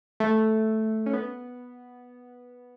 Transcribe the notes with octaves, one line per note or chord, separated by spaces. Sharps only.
A3
C#4
B3